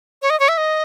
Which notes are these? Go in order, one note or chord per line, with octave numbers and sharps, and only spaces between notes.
C#5
D#5
C#5
E5
D#5